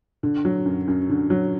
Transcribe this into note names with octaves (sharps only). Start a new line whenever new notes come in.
D3
F#3
F#2
F#2
D3
F#3